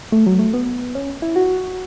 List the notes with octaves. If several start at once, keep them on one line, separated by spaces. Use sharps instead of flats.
A3
F#3
A3
B3
C#4
E4
F#4